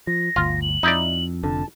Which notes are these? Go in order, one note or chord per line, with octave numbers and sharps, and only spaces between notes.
F3 A#6
G1 D2 F4
F#7
F2 D#4 E4 D5
F1 F2 D3 A5